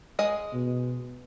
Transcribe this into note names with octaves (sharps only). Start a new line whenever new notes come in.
G#3 G#4 D#5
B2